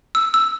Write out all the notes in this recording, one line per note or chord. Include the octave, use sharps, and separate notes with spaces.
E6
E6